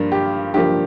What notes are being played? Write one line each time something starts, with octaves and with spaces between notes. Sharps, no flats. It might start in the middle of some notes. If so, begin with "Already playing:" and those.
Already playing: G2 F3 A#3 F4
G4
G2 F3 A#3 G4